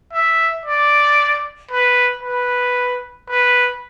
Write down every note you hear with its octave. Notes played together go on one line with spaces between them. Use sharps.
E5
D5
B4
B4
B4